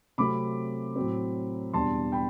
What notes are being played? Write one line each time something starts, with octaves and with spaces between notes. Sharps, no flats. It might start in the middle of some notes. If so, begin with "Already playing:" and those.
C3 F#3 A3 C4 B5 D6
A2 F#3 C4
E2 B2 G3 D4 A5 C6
G5 B5